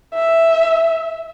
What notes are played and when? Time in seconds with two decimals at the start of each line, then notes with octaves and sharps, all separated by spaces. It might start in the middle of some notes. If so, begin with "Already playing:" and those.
0.14 E5